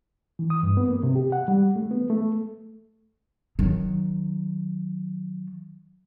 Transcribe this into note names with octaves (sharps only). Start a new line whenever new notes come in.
E3
D#6
G2
B3
A#3
C3
G4
F#5
G3
A3
B3
A3
D#3 F#3